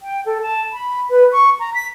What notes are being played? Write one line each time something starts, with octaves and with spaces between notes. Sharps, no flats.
G5
A4
A5
B5
B4
C#6
A#5
B6